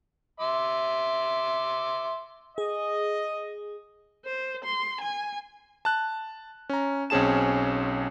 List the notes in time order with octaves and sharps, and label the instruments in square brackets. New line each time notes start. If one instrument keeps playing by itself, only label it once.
[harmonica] E5 C6 D6
[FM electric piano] G#4 [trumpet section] D#5
[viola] C5
C6
G#5
[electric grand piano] A5 F#6
C#4 A#5
B1 C4 C#4 G#4 A5 E7